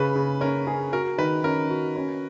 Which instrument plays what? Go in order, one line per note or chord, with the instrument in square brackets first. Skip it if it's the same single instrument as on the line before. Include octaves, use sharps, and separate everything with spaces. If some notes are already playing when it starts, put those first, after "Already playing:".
Already playing: [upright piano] C#3 [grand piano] B4
[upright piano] C#3
[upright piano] C#4 [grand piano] A#4
[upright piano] G#4
[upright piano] F#4 [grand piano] A#4
[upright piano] D#3 [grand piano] B4
[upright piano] C#4 [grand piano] A#4
[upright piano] F#4
C#4